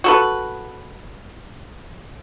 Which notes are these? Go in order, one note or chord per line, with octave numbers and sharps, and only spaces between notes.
F#4 A4 B4